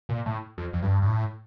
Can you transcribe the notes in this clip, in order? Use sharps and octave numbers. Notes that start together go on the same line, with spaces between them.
A#2
A2
F2
F2
G2
G2
A2